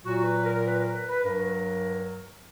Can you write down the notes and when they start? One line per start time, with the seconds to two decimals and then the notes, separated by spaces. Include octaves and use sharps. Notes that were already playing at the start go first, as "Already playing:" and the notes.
0.04 A#2 F#3 F#4
0.23 B4
0.44 A#4
0.64 B4
0.78 A#4
0.93 B4
1.08 B4
1.23 G2 F#3 A#4